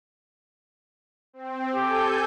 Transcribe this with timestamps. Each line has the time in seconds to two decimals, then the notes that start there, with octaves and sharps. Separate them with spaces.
1.33 C4
1.75 G4 A4 G#5 G6